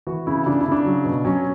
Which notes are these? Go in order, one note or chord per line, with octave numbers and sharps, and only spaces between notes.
E3 F#4
C#3 E4
C#3 D4
E4
C#3
D4
F#3
B2
F#3 C#4